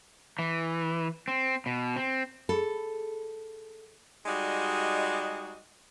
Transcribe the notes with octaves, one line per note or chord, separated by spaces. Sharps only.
E3
C4
B2
C4
G#4 A4 B5
G3 G#3 D#4 F#4 D5 D#5